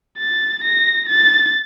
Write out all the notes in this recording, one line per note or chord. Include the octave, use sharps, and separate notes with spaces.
A6
A#6
A6